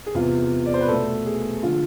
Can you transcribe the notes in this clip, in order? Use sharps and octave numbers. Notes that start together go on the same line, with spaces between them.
G#4
E2 C3 G#3 F4
D5
C5
B4
B2 A3 A4
G#4
D3 F3 G#3 F4